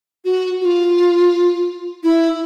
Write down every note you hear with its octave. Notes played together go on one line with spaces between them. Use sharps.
F#4
F#4
F4
E4